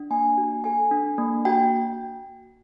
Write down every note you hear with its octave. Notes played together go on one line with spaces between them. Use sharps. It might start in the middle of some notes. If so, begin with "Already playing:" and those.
Already playing: D4
A#3 G#5
F#4
A4 G#5
D4
A#3
F#4 G5